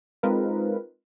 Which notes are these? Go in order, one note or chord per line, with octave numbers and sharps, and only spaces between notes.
G#3 C4 D#4 F4 A#4 B4